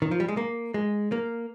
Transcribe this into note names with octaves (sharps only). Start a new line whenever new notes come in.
D#3
F3
G3
G#3
A#3
G#3
A#3